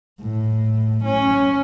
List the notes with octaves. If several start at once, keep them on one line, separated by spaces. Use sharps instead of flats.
A2
C#4